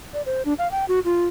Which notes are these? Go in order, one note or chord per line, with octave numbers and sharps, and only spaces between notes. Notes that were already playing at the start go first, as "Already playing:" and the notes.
D5
C5
D4
F5
G5
F#4
F4